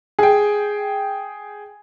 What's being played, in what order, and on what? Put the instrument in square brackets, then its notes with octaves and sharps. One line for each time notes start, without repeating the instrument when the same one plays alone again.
[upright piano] G#4 G5